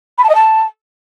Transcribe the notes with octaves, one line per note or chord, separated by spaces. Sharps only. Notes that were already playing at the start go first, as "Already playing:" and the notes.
B5
A5
D#5
A5